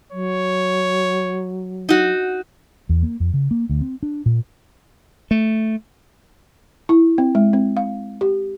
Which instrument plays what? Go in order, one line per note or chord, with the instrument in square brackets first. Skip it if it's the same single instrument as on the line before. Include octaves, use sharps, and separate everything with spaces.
[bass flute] F#3 [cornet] C#5
[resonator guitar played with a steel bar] D#4 F#4
[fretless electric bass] E2
A#3
F2
C#3
A#3
D2
C4
D4
A#2
[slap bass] A3
[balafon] E4
C4
G#3
C4
F5
G4